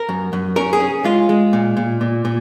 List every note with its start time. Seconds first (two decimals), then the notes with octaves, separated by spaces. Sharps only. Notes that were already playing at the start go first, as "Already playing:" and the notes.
Already playing: A#4
0.09 F#2
0.33 F#2
0.56 C#4 A#4
0.73 G#4
0.80 C#4
1.04 G#3 F4
1.29 G#3
1.53 A#2
1.77 A#2
2.01 A#2
2.25 A#2